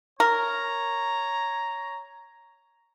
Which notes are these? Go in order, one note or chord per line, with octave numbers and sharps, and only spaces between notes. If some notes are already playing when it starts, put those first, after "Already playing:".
A#4 C#5 A#5